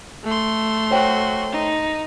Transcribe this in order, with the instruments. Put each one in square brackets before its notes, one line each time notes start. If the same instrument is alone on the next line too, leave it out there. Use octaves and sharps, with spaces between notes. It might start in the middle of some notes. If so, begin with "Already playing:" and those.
[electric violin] A3 C6
[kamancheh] F#4 [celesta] C5 C#5 G5
[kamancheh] D#4